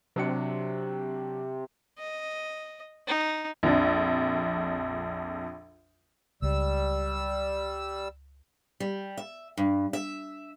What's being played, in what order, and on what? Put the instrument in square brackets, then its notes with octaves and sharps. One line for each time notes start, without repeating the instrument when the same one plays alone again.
[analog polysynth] C3 [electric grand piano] F#3 D4 C#7
[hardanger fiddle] D#5
D#4
[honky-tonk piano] A#1 F2 D4
[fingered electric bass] C#2 [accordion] G3 E6
[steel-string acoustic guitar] G3
E5
G2
E5